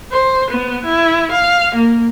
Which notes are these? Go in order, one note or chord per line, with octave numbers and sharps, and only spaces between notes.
C5
B3
E4
F5
A#3